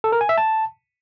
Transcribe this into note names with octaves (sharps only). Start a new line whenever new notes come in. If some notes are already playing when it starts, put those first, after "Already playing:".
A4
A#4
G#5
E5
A5